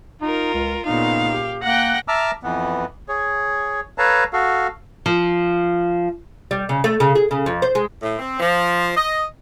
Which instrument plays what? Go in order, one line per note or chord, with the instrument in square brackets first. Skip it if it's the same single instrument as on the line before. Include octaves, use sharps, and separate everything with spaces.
[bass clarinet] D#4 [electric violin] F4 A#4
[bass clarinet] C#2
[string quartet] A#2 C#3 B3 [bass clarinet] D#4 [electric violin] F5
[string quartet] G4
[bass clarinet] A#3 [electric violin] F#5 [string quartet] G5 F#6 A#6
[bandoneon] E5 A5 A#5 D6 E6 F6
F2 E3 B3
G#4 C#5
A4 B4 C#5 F5 A5 A#5
F#4 A4 F5
[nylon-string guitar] F3
[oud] G3
C#3
A3
C#3
G#4
C#3
F2
C5
G#3
[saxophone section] A2
C4
F3
D#5